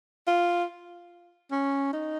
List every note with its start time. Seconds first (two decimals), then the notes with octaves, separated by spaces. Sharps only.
0.27 F4
1.51 C#4
1.93 D#4